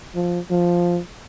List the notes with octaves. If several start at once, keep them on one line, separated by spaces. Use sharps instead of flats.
F3
F3